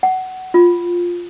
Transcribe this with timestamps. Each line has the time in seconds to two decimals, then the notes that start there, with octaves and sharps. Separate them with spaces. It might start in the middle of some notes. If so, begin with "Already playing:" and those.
0.03 F#5
0.54 F4